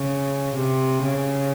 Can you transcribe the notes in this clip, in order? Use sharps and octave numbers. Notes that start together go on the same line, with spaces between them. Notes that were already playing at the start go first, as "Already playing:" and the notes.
Already playing: C#3
C3
C#3